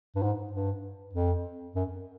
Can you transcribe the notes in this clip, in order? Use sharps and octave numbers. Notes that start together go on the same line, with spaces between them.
G2
G#2
G2
F2
F#2